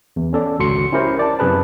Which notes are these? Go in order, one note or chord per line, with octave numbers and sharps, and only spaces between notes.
E2
C#4 A4 D5
G#1 C#2 D3 F#4 C6 C#7
C#4 E4 G4 A#4 C5
D5 A5
F#2 C3 G#4 B4 A5